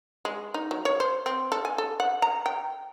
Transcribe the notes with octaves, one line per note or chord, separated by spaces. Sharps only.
G#3
D#4
F#3
C#5
C5
C4
A4
G#5
A4
F#5
A#5
G5